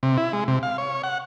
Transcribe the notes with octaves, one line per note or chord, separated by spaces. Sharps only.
C3
E4
G#3
C3
F5
C#5
F#5